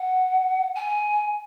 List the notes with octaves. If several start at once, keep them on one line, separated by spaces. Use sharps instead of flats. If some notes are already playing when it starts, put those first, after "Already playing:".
Already playing: F#5
G#5